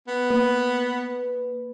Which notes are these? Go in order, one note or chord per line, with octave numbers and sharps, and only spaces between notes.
B3
A#3 B4